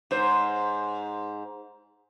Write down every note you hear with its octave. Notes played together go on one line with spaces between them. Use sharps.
G#2 C5